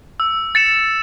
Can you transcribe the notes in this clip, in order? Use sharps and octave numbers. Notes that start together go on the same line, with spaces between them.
E6
A6 C#7 E7